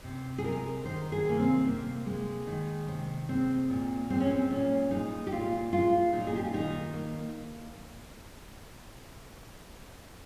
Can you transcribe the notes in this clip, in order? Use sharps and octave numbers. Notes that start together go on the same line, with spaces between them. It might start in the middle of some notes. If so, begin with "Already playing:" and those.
C3
G#4
G#3 A#4
D#3 C5
G#4
C3 A#3
C4
C3 A#3
G#3
D#3
C3
G#3 C4
A#2
G#3 C4
C#4
C4
A#2 C#4
G#3 D#4
G4
A#2 F4
G#3 F4
A#2 D#4
G#4
G4
F4
D#3 D#4
A#3